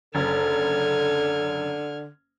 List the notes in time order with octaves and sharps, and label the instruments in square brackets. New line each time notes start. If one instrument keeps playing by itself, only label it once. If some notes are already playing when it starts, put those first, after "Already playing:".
[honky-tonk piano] F#1 [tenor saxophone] D3 [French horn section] A4 [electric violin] F6 G#6